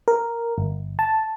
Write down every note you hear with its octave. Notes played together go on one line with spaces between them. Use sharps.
A#4
G1
A5